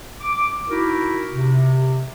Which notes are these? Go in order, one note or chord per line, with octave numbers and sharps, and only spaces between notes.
D6
D#4 E4 F#4 A#4
C3